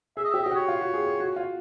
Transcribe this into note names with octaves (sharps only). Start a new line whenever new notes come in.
G#4 E5
D#5
G4 E5
G4 D#5
F#4 C#5
F4
F#4
G#4
G#4
F#4
F4